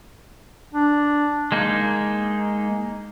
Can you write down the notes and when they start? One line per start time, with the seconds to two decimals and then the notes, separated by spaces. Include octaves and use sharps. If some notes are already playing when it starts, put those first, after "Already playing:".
0.74 D4
1.52 G#3 A#3 D#4